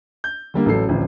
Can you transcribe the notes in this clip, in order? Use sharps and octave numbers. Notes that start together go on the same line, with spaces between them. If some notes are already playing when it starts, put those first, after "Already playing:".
G6
D3 G3 A#3
A1 F#3 A4 C7
D1 A1 F3